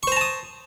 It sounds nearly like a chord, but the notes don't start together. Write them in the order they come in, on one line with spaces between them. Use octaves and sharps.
C#6 C5 A#5 A5 D#6